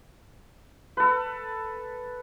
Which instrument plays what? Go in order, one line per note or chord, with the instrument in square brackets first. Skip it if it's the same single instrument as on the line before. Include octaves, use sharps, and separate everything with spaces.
[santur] A4 B4